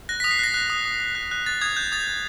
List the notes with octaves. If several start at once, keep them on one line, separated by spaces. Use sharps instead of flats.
F#6 A#6
D#6 B6
C7
F#6 A#6
F#6
D#6
D#6
D#6
F#6
F#6
F#6 A6
D#6 G#6
F#6 G6
D#6 A6
F#6